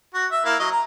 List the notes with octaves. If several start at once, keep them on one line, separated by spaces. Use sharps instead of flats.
F#4
E5
A#3 E4 F5
F#3 D#5
A#5